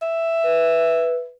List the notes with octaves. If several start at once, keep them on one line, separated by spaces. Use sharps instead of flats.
E5
B4